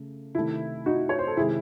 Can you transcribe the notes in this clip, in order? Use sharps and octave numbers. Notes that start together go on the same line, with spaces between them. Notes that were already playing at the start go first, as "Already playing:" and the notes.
Already playing: C#3 A3
C3 D#3 A3 E4
D#4 F#4
C#5
C5
A4
C3 D#3 G#3 E4 G#4